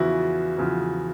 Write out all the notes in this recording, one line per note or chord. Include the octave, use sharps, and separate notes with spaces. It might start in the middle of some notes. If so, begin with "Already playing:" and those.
Already playing: E2 C#3 F3 E4 F#4
E2 C#3 F3